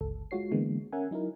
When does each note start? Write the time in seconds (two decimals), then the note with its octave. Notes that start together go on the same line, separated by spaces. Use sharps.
0.01 G1 C#2 A4
0.31 G#3 F4 F#4 C#5 C7
0.51 D3 E3 G#3 A#3 B3
0.92 C#4 A#4 E5 F#5 G#5
1.11 F#3 D#4 E4 A#4